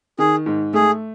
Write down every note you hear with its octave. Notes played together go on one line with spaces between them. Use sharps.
D#3 G#4
G#2
A3 G#4